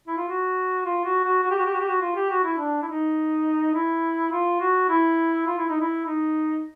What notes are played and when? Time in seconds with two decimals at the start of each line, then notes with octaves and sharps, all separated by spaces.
0.08 E4
0.17 F4
0.28 F#4
0.85 F4
1.05 F#4
1.25 F#4
1.44 F#4
1.51 G4
1.59 F#4
1.66 G4
1.73 F#4
1.80 G4
1.88 F#4
2.01 F4
2.16 G4
2.30 F#4
2.44 E4
2.58 D4
2.82 E4
2.87 D#4
3.74 E4
4.32 F4
4.60 F#4
4.90 E4
5.47 F4
5.59 E4
5.70 D#4
5.80 E4
6.05 D#4